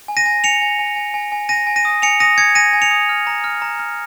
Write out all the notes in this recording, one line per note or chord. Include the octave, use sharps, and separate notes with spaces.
G#5
A#6 D#7
G#5
G#5 C#7 F7
G#5
G#5
G#5
G#5
G#5
G#5 A#6 D#7
G#5
A#6 D#7
D#6
G#5 C#7 F7
D#6 A#6 D#7
D#6 G#6 C#7
G#5 A#6 D#7
G#5
C#7 F7
D#6
F6
A#5
F6
A#5
F6